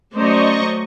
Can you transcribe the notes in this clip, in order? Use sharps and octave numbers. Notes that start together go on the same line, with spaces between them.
F#3 A3 C#4 C5 D5 D#5 A#5 C#6